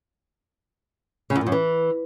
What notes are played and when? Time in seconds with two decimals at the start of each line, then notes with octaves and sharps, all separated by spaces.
1.30 C#3
1.36 E2
1.41 A#2
1.47 F#2
1.52 E3